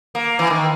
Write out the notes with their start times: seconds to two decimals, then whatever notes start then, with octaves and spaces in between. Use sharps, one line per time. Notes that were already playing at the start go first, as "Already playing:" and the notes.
0.15 A#3
0.39 E3
0.50 D#3